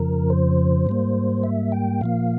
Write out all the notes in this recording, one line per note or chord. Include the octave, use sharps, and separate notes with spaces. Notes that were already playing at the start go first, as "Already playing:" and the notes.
Already playing: F2 C#3 F3 A#4
C5
G#2 G3 A#3
E5
G5
A#2 F3 A#3 F5